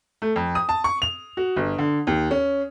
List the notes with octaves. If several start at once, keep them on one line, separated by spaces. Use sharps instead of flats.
A3
F2
D#6
A5
C#6
F7
F#4
G1
D3
D#2
C#4